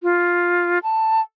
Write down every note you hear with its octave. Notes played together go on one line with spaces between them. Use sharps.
F4
A5